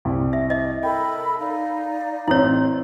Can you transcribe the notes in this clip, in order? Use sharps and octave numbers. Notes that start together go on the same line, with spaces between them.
C2
E5
D#5 E5
A4 A#4 G5 B5
D#4 D5 F5
A1 C4 E4 A4 C#5